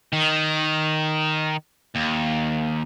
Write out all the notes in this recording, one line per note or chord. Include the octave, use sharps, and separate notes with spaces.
D#3
D#2